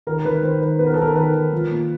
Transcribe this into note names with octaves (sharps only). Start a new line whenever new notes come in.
D#3 A#4
D#3 B4
D#3 C5
D#3 B4
B3 B4
A#4
A4
D#3 A#4
D#3 B4
D#3
F3
A#2